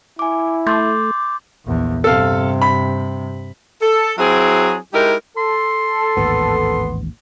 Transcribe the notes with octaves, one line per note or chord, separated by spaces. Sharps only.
E4 G#5 D6
A3 C6 D6 G6 A6
A#1 E2
G2 C3 A4 F5
B5
A4
F#3 C4 E4 G#4
G#3 D#4 E4 G4 A#4
A4 C6
A1 D#2 G#2 B3